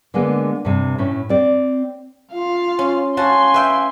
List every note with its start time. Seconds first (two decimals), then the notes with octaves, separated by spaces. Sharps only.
0.14 D3 G#3 A#3 B3
0.65 G2 C3
0.98 A2 C#4
1.29 C4 D5
2.33 F4 F5
2.79 C#4
3.17 C#4 F#4 F5 G#5 A5 C6
3.54 B4 E5 G5